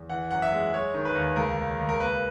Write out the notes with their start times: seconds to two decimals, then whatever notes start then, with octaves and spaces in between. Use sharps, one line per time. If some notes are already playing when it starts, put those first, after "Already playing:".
Already playing: E2
0.09 E3 F#5
0.31 F#2 F#5
0.42 E5
0.52 G#3
0.73 G#3 C#5
0.94 D#3
1.05 B4
1.15 D#2
1.36 C#2 A#4
1.57 C#2
1.79 C#2
1.89 A#4
2.00 A#3 B4